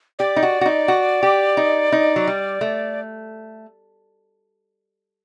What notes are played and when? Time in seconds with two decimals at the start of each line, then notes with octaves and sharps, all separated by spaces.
0.19 G4 D5
0.36 D#4
0.43 F#4
0.61 F#4
0.66 D#4
0.88 F#4
1.23 G4
1.57 D#4
1.92 D#4
2.16 F#3
2.27 G3
2.61 A3